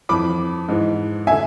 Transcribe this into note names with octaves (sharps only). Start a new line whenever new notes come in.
F2 E3 B5 D6
G#2 E3
D3 E5 G#5